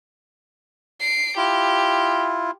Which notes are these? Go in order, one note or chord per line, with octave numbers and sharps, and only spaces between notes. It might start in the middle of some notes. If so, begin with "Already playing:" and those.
C7 D7
E4 F4 G4